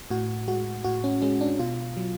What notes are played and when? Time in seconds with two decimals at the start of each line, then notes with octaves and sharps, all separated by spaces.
0.10 A2 F#4
0.48 G#3 F#4
0.84 A2 F#4
1.04 C#4
1.22 G#3 C#4
1.41 D4
1.59 B2 F4
1.97 F#3